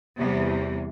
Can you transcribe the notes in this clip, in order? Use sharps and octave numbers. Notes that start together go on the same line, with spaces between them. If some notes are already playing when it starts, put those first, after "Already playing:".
E2 C3 E3 G3 B3